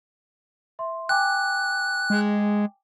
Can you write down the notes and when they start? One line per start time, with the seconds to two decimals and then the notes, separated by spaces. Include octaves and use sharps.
0.79 E5 C6
1.09 G5 G#5 D6 F#6
2.10 G#3